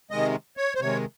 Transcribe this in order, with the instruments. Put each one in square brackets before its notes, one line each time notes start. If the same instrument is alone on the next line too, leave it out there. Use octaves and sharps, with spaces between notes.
[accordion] C3 D#3 G#3 D#5
C#5
C5
C3 D#3 G#3 C#5